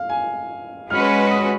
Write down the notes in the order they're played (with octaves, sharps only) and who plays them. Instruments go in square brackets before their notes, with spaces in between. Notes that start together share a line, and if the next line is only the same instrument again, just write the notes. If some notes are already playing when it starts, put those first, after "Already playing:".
Already playing: [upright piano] F5
G#5
[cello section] G#3 C#4 F#4 B4 [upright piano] F6
[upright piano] D#6